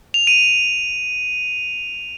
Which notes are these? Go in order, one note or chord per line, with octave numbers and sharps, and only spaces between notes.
F7
D#7